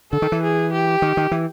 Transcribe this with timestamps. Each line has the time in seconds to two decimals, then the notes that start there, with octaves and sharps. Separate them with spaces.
0.12 D3 A4
0.22 D#3
0.32 E3
0.43 G#4
0.72 G4
1.02 D#3
1.17 D#3
1.31 E3